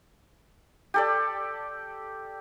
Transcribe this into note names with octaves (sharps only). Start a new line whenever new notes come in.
G4 A4 D5